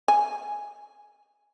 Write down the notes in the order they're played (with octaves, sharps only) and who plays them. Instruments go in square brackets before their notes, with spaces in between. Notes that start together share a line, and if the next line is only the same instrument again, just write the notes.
[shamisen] G#5